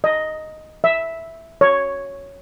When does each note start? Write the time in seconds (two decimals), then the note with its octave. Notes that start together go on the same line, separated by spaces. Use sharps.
0.04 D#5
0.84 E5
1.61 C#5